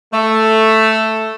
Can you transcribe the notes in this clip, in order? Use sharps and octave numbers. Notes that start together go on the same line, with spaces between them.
A3